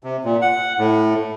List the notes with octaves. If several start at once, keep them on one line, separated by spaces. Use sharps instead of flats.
C3
A#2
F#5
A2